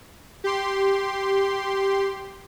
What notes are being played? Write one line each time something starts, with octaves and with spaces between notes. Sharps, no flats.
G4 C6